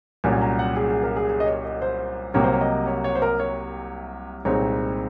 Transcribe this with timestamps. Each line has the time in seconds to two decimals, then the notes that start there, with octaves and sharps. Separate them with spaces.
0.24 C2 A#2 F#3 C#4 G#5
0.42 A#5
0.59 F#5
0.76 G#4
0.90 G#4
1.03 A#4
1.16 G#4
1.29 G#4
1.40 D#5
1.47 C#5
1.64 D#5
1.82 C5
2.34 C2 C3 F#3 A#3 C#5
2.44 C5
2.52 C#5
2.61 D#5
2.87 C#5
3.04 C#5
3.15 C5
3.22 A#4
3.40 C#5
4.45 C2 A#2 G#3 C4 D#4 C#5